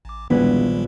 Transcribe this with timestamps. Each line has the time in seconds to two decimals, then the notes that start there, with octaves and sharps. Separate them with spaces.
0.05 A1 D6
0.30 E1 A#1 D#3 G3 G#3 B3 B4 G#5